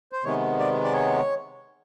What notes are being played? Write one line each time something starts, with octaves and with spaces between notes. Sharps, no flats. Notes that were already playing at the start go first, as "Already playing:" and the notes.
C5
C3 D#3 G#3 B3 C#5
D5
D5
C#5